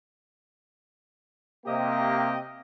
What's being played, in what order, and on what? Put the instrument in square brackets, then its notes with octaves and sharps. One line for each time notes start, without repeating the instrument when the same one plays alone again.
[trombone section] C3 A#3 [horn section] G4 D#5